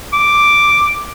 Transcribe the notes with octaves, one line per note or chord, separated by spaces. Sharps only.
D6